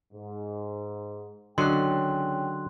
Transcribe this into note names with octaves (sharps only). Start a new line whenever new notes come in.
G#2
C#2 D3 F#3 C#4 D#5 G5 C6 F#6